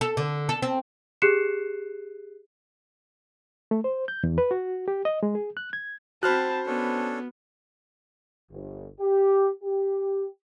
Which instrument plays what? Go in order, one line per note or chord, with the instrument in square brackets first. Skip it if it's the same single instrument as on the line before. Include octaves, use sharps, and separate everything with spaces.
[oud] A4
D3
A4
C4
[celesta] G4 G#4 F#6 C7 C#7 E7
[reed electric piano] A3
C5
G6
E2
B4
F#4
G4
D#5
G#3
G#4
F#6
G#6
[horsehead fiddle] C4 A5 [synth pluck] F#4 B5 [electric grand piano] C5 F6 F#6
[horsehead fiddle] B3 [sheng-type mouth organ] C#4 D4 A4
[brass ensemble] G1
G4
G4